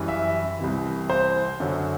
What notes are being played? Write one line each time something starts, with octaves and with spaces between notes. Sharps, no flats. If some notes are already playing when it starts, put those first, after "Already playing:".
Already playing: F#2 E3 G3
E5
C2 C3 E3
C5
F#2 D3 F#3